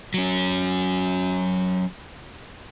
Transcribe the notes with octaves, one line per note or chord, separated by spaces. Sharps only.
F#3 C#4